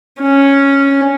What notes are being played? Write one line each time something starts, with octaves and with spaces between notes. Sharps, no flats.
C#4